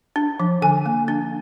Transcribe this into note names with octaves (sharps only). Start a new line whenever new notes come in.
D4
F3
D3 G#5
A#3
D4